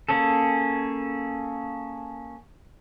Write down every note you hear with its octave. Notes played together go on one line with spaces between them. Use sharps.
A#3 C#4 G#4 A4